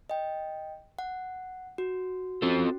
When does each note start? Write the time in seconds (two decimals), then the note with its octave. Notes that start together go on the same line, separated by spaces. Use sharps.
0.10 D#5 G5
0.99 F#5
1.78 F#4
2.42 C4 C#4 F4 F#4 A4